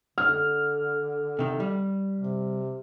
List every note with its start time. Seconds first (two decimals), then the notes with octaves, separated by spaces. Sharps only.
0.18 D3 F6
1.39 C3 D#3
1.60 G3
2.19 C3